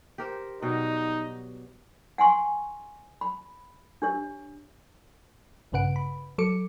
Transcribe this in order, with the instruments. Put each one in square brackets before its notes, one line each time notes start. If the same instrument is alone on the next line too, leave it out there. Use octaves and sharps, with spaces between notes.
[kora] G4 A#4 C5
[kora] B2 F#3 G3 [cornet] D#4
[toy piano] F#5 G#5 C6 C#6
B5
D4 G4 C#5
[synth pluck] A#1 G2 C#3 B4 F#5 D7
B5
F#3 A4 D6 C#7